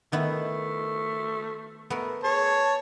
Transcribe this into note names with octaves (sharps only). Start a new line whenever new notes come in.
D#3 A3 B3 E4
A3 B3 A#4
G#4 C#5 A5